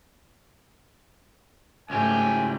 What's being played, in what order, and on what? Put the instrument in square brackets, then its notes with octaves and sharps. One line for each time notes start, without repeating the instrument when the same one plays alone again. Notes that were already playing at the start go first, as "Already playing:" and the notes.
[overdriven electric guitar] C#2 G4 [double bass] G#2 A3 [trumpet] G#5